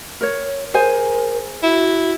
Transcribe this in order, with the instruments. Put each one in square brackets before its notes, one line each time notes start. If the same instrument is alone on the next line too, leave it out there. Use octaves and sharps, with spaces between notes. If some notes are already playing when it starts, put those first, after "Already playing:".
[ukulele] A#4 C#5
[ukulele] G#4 C5 G#5 [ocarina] A#4
[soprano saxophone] E4 [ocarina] F#4